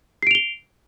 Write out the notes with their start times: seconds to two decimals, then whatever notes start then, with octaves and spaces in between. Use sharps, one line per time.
0.22 C7
0.27 D7
0.31 F7
0.35 G7